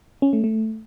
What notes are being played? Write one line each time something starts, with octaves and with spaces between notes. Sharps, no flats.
C#4
A3
A3